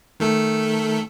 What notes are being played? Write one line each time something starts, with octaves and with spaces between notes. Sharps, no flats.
D#3 A3 A4